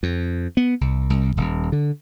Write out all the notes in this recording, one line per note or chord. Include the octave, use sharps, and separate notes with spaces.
F2
B3
C2
C2
D#1
D3